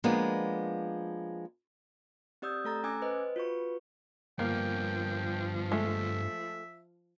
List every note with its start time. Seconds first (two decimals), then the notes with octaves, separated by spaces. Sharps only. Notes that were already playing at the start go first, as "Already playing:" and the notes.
0.04 F3 G#3 A#3 B3 D4
2.42 C4 G4 D5 D#6 E6 G6
2.64 A3 A4 A#5 A6
2.84 C#4 G5 G#5 D6 E6 G#6
3.02 B4 C5 D#5
3.36 F4 F#4 B4 C#6
4.39 G2 F3 A#3 B3 G5
5.72 G#3 A3 E5